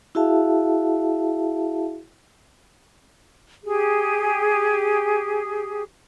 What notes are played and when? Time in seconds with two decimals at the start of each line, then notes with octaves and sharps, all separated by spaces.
0.15 E4 F#4 G#4 E5 F5 A5
3.64 G4 G#4